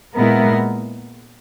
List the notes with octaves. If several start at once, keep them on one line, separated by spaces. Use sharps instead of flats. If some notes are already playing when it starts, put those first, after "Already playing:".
A#2 G#3 B3 E4 A#4